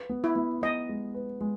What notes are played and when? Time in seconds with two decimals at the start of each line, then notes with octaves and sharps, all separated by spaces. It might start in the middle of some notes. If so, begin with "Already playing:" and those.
Already playing: B4
0.09 B3
0.24 E4
0.36 B3
0.62 B3 D#5
0.89 G#3
1.14 B4
1.41 G#3